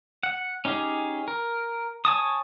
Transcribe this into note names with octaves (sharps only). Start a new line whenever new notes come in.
F#5
C#4 D#4 G4 G#4
A#4
C#5 G#5 A5 D#6